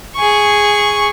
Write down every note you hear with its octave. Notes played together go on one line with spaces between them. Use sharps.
G#4 C#6